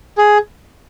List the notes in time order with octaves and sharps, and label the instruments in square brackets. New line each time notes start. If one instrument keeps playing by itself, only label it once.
[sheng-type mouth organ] G#4